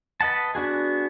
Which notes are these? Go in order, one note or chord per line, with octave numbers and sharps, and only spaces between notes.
B4 D#5 F#5 A5
B3 D4 F#4 G#4